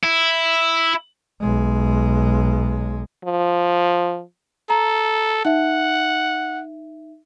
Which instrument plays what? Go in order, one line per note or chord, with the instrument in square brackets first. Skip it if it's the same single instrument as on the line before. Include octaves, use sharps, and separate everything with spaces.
[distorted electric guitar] E4
[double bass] B1 G#3
[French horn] F3
[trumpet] A4 [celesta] A#5
[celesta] D#4 E5 [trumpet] F#5